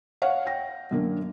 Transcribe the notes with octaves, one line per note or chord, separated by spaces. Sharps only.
C#5 F5 F#5
G5 A#6
F#2 D3 A#3